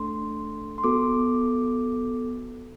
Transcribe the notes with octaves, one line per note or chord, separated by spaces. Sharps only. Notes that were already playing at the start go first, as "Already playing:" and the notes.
Already playing: A3 D4 A4 C6
C6
B3 F#4 A4 D6